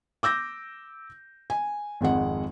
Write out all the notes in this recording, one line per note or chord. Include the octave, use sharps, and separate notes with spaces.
D6 E6 G6 A#6
G#5
G#1 F2 G#3 F#5